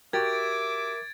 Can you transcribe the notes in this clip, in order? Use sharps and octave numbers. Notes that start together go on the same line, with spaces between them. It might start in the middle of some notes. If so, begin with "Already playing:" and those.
F#4 G4 A#4 E5 D6 G#6 A6 D7